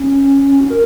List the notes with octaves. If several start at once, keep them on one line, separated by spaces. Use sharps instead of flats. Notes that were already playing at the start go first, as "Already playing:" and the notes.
Already playing: C#4
F#4
A#4